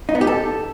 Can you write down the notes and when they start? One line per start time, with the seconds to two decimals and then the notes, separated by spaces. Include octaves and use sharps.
0.09 D#4
0.15 B3
0.21 G4
0.27 A4